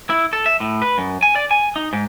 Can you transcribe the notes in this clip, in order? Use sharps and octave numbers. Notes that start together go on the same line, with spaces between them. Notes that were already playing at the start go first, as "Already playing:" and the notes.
E4
A4
E5
A2
B4
F#2
G#5
D5
G#5
D#4
G#2